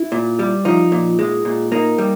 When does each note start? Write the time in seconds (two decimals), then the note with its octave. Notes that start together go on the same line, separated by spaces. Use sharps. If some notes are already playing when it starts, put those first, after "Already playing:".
Already playing: E4
0.12 A#2
0.39 G3
0.65 F3 D#4
0.92 A#2
1.19 G#3
1.45 A#2
1.72 A#3 D#4
1.98 G3